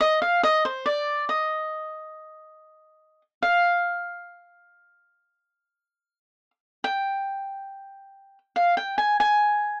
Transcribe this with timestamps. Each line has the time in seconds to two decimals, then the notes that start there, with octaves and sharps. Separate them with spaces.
0.01 D#5
0.22 F5
0.43 D#5
0.65 C5
0.86 D5
1.29 D#5
3.43 F5
6.84 G5
8.56 F5
8.77 G5
8.98 G#5
9.20 G#5